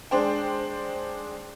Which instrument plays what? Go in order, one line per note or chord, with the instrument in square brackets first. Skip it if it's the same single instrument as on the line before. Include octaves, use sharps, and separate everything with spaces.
[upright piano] G#3 D4 C5 G5